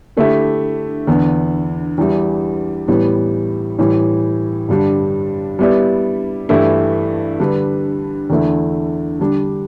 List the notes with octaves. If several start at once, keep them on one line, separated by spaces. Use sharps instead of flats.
D3 A3 E4 G4 E5
E2 D3 B3
E2 E3 G3 E4
A2 E3 G3 B3
A2 E3 G3
G2 D3 G3 D4
G3 B3 E4 G4 D5
G2 E3 A3 E4 G4
D3 G3 D4 B4
E2 D3 A3 E4
D3 G3 D4